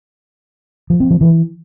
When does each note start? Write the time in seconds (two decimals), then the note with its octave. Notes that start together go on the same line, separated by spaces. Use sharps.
0.90 F3
1.00 C4
1.11 F3
1.21 E3